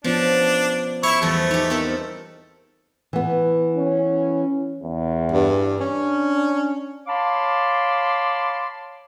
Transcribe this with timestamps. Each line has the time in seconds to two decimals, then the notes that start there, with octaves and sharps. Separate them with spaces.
0.04 F3 B3 C#4 D4 F4
1.03 E4 C#5 E5 C#6
1.22 E2 F3 G3 A3 G#4
1.51 D#4 G4 C#5
1.70 B3 C4 D#4 A4 A#4 D5
3.13 E3 B3
3.75 C#4
4.82 E2
5.32 G2
5.80 C#4 D4
7.08 C#5 F5 A5 B5 C6 D6